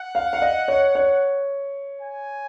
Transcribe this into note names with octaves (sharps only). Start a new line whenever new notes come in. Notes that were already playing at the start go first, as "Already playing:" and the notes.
Already playing: F#5
F5
F5
D#5
C#5
C#5
G#5